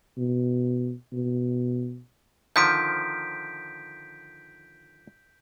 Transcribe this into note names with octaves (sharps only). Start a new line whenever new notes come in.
B2
B2
D3 D#3 F3 G6 B6 D7